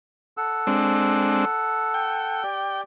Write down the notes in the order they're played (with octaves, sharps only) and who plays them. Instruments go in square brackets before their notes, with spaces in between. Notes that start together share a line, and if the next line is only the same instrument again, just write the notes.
[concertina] A4 F#5 E6
[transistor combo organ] G#3 C4 D4
G5
[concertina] G4 D5